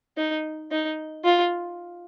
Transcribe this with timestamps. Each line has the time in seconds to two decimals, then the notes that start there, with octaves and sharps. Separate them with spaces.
0.17 D#4
0.71 D#4
1.25 F4